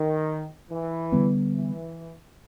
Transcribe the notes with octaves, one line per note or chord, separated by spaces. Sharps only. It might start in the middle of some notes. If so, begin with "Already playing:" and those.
Already playing: D#3
E3
D3 G3 B3
E3